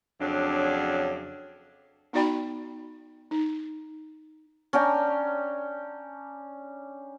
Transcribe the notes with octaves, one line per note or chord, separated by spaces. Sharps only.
F2 C#3 F#3 D4
B3 D#4 F#4 D5 G5 B5
D#4
C#4 D4 G5 A#5